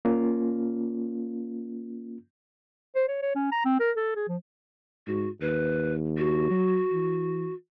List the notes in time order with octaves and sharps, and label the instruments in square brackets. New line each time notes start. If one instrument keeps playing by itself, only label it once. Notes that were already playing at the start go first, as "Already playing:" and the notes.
[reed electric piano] A#3 C#4 F4
[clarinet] C5
C#5
C#5
C#4
A#5
C4
A#4
A4
G#4
F3
[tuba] G#2 [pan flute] F#4
[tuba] D#2 [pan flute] B4
[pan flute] F#4
[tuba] F#3
E3